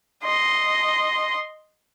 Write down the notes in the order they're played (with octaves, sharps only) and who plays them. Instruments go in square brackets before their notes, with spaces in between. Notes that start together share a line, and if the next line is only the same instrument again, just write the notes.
[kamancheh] D#5 C6